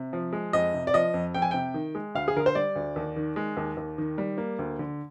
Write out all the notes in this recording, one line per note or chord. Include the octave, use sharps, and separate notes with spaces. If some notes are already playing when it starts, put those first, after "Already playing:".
Already playing: C3
F3
G#3
F2 D#5
C3
D5
F3 D#5
F2
F2 G5
G#5
C3 G5
D#3
G#3
D2 F5
G#4
D3 A#4
C5
G3 D5
D2
D#2
D#3
G#3
D#2
D#2
D#3
G3
A#3
D2
D3